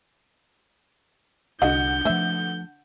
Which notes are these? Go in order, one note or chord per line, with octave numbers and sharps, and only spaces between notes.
C2 D3 F#4 D#5 F#5 G6
F3 A3 B4 C5 E5